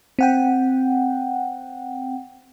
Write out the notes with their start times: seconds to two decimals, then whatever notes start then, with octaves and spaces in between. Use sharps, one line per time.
0.19 C4 F#5 G5